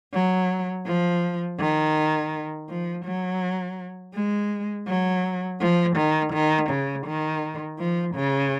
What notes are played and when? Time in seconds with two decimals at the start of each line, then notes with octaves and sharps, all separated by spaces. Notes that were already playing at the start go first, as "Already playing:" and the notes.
0.13 F#3
0.86 F3
1.60 D#3
2.69 F3
3.05 F#3
4.14 G#3
4.88 F#3
5.60 F3
5.97 D#3
6.33 D#3
6.70 C#3
7.07 D#3
7.79 F3
8.15 C#3